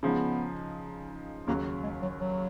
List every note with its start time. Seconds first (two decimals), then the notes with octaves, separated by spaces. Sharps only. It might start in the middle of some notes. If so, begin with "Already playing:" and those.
0.03 C#3 F3 G#3 B3 D#4
1.47 D#2 C#3 F#3 A#3
1.83 G#3
2.02 F#3
2.20 F#3